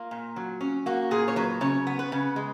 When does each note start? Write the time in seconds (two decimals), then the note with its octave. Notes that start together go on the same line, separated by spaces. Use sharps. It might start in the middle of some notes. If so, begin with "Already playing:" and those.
Already playing: A#3 F4
0.11 A#2
0.36 F#3
0.61 C#4
0.86 A#3 F#4
1.11 A#2 G#4
1.28 C#5
1.36 F#3 B4
1.61 C#3 C#5
1.87 B3
1.99 B4
2.12 C#3
2.36 G#3